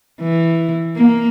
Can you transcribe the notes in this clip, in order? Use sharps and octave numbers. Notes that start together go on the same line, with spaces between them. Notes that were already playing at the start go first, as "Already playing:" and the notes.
E3
A#3